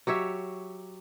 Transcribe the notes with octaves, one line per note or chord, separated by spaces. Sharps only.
F#3 G4 C#5 E5